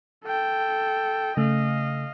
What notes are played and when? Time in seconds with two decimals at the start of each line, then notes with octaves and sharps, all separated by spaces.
0.25 A4 G5
1.37 C#3 A3 D#5 F5